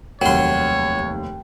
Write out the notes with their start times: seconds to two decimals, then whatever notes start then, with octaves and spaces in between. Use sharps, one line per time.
0.22 F1 D#2 F#3 C#5 G5 C6